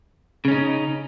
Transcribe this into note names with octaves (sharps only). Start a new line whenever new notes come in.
C#3 C#4 D#4